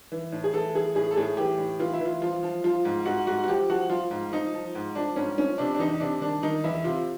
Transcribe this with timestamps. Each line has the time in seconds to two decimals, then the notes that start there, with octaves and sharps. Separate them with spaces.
0.12 E3
0.32 A2
0.44 G#4
0.53 E3 A4
0.75 E3 G#4
0.95 A2 G#4
1.11 A4
1.17 A2 G#4
1.37 E3 G4
1.58 A2
1.79 E3 F4
1.93 E4
2.00 E3
2.05 F4
2.21 F3 F4
2.43 F3
2.64 F3 F4
2.85 G#2
3.05 G#2 F#4
3.27 G#2 F#4
3.44 F#4
3.48 F3 G4
3.70 F3 F#4
3.90 F3 F4
4.11 G#2
4.32 F3 D#4
4.53 F3
4.75 G#2
4.95 F3 D4
5.16 G#2 C#4
5.37 F3 C#4
5.58 C3 D4
5.74 D4
5.79 E2 D#4
6.00 C3 D4
6.21 D#3 D4
6.43 D#3 D#4
6.64 E2 E4
6.84 C3 F4